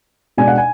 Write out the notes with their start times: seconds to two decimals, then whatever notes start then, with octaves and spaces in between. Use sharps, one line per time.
0.37 B2 G#3 B3 D4 G#5
0.48 F#5
0.58 G#5